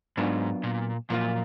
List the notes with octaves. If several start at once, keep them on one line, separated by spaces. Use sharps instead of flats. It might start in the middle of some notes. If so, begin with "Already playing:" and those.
G#2 F#3 B3 D4 F4 A#4
A#2
F#2 A#2 F3 A#3 F4